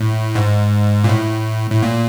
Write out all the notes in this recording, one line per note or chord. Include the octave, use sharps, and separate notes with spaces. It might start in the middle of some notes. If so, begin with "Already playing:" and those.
Already playing: A2
G#2
A#2
A2
A2
A#2